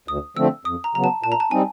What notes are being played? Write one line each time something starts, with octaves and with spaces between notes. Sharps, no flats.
D2 D#6
D3 F3 A3 C4 E6
F2 D#6
A#5
C#3 F#3 B3 A#5
A5
A#2 A5
A#5
A5
G3 C4 D#4 G#5